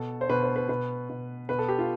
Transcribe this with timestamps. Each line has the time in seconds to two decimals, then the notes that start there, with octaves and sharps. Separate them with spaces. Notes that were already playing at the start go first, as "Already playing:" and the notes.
Already playing: B2 A4
0.21 C5
0.29 B2 B4
0.43 C5
0.56 B4
0.69 B2 B4
1.09 B2
1.49 B2 B4
1.59 A4
1.68 G4
1.79 F4